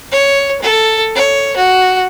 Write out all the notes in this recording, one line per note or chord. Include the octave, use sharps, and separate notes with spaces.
C#5
A4
C#5
F#4